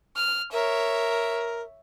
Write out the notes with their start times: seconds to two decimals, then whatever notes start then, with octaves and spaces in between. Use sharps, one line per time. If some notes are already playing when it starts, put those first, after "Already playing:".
0.16 F6
0.53 A#4 C#5 E5